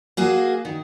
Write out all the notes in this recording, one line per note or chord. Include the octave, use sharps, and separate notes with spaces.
A#3 F#4 G#4
D#3